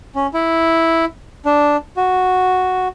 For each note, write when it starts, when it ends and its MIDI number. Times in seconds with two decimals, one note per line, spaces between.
0.15 0.27 61
0.34 1.05 64
1.45 1.77 62
1.97 2.88 66